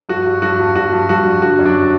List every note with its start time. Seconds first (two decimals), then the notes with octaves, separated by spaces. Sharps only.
0.09 G2 F#4
0.26 G2
0.42 G2 F#4
0.59 G2
0.75 G2 F#4
0.93 G2
1.09 G2 F#4
1.25 G2
1.42 D3 F#4
1.59 F#2
1.65 D4